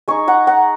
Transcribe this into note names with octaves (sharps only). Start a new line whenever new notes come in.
G#3 D#4 G#5 C#6
F#5 A#5
F#5 A#5